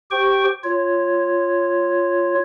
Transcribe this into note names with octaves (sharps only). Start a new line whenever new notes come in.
G4 C5 G5 C#6
F4 C#5